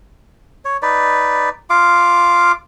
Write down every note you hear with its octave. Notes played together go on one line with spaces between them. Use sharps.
C#5
D#4 B4 D5
F4 F5 D6